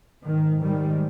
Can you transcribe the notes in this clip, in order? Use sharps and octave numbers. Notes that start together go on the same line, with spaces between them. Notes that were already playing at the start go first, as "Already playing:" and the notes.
G#2 D#3
D#3 G3